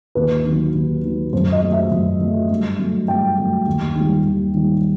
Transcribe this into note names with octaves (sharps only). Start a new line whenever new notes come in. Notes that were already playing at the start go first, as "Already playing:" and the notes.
D#2 B4
D#3
F#3
D#2
D#3 F#3
F#2 C5
D#5
F#3 A3
E5
F#2
F#3 A3
G2
F#3 A3
G2 G5
F#3 A3
D#2
D#3
G3
D#2
D#3 G3